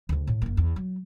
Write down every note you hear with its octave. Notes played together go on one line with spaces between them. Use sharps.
D2 C#3
A2
F#1 A#3
E2
F#3